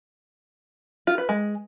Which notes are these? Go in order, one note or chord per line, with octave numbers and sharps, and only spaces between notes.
F4
B4
G#3